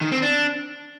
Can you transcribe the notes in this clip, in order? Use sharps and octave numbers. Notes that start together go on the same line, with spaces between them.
D#3
C4
D4